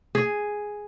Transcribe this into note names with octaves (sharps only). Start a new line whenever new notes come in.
G#4